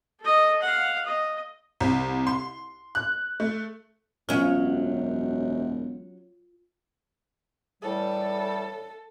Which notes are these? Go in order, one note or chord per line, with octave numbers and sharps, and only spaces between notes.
A4 D#5
F5 F#5
D#5
C2
C6
F#6
A3
E1 F#2 F#3 C#4 F4 F5
A2 E3 G3 A4